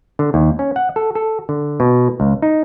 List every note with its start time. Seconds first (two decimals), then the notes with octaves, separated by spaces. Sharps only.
0.19 D3
0.34 D#2
0.59 C#4
0.76 F#5
0.96 A4
1.15 A4
1.49 D3
1.80 B2
2.20 C#2
2.42 D#4